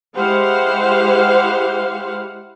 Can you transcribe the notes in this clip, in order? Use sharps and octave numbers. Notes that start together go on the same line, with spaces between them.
G#3 E4 G4 C5 F5 F#5